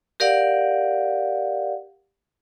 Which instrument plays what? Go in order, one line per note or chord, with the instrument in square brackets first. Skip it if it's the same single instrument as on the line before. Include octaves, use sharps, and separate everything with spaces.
[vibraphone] G4 A#4 D5 F5 F#5